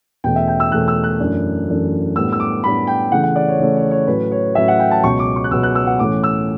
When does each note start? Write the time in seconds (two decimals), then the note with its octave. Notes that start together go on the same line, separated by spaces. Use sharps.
0.24 E2 B2 A3 C#4 G5
0.36 E5
0.48 G5
0.60 E6
0.72 E2 B2 A3 C#4 F#6
0.88 E6
1.04 F#6
1.20 F#2 E3 A3 D4
1.68 F#2 E3 A3 D4
2.15 A2 G3 B3 D4 E6
2.33 E6
2.40 D6
2.63 A2 G3 B3 D4 B5
2.87 G5
3.12 C#3 E3 A3 F#5
3.23 F#5
3.36 D5
3.48 C#5
3.59 C#3 E3 A3 C#5
3.76 C#5
3.91 C#5
4.07 A2 F#3 C#4 B4
4.31 C#5
4.55 A2 F#3 C#4 E5
4.68 F#5
4.80 G5
4.91 A5
5.03 C#2 B2 F#3 B3 C#6
5.19 D6
5.36 C#6
5.44 F#6
5.51 C#2 B2 F#3 B3 E6
5.63 F#6
5.75 E6
5.87 F#5
5.99 A2 E3 A3 C#4 D6
6.24 E6